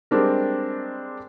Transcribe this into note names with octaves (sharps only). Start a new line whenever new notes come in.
G3 G#3 C4 D4 A#4